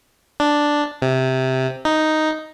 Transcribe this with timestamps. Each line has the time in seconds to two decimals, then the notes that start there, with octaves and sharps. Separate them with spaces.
0.40 D4
1.02 C3
1.85 D#4